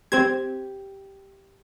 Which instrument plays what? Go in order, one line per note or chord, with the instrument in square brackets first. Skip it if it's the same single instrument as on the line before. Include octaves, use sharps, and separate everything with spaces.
[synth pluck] C4 C5 G#6 [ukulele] G4